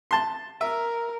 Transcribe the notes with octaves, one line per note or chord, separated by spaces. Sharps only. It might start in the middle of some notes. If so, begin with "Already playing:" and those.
A5 C6
A#4 E5